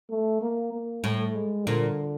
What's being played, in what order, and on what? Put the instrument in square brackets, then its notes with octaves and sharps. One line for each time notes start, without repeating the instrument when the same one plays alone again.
[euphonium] A3
A#3
A#3
[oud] A2 [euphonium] A3
[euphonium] G#3
[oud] A#2 [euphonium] D3